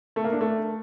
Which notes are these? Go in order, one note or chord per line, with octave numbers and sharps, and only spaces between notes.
A3
A#3
D4
A3